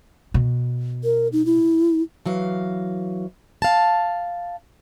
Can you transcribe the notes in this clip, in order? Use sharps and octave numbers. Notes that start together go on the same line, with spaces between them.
B2
A#4
D#4
E4
E3 F#3 F5
F5 A5